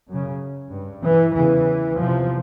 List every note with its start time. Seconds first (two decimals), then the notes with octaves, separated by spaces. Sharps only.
0.09 F#2 C#3
0.72 G2
1.03 E3
1.34 E2 C#3 E3
1.97 E2 C3 F3